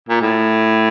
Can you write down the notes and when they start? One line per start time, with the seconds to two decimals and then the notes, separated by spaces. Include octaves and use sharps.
0.09 A#2
0.22 A2